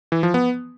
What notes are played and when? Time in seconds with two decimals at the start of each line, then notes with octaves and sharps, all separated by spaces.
0.12 E3
0.23 F3
0.34 B3